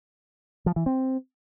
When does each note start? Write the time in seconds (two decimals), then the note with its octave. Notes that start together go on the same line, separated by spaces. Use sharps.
0.66 F3
0.76 E3
0.86 C4